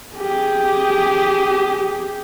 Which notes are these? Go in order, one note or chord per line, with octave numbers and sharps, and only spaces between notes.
G4 G#4